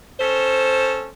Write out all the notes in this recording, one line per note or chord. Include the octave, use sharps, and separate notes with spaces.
C#4 A4 C5